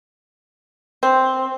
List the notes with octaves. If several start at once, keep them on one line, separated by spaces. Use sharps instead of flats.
C4